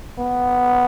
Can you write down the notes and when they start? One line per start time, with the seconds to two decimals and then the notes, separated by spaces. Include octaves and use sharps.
0.19 B3